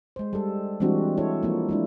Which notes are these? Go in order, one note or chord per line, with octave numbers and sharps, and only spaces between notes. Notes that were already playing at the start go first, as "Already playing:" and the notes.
G#3 C5
G3 A4
E3 G3 G#3 C4 D4 F#4
E4 A4 C#5
F3 A#3
G#3 D4 E4